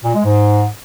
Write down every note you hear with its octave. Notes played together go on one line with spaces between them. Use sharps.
A#2
G#3
G#2